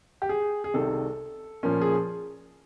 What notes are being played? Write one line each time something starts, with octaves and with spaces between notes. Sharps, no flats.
G4
G#4
G#4
C2 C3 D#3 A4
A#2 F3 A#3 C#4
G#4